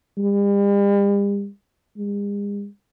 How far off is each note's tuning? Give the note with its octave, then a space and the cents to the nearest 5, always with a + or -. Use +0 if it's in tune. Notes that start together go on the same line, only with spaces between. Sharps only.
G3 +40
G#3 -45